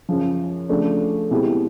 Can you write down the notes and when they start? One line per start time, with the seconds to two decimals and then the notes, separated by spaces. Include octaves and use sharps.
0.09 F#2 C#3 F3
0.69 C#3 F3 A3 D4
1.31 B2 G#3 C4 E4 G4